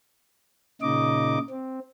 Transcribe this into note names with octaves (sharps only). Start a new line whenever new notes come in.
A#2 C#3 D#4 D#5 D6
C4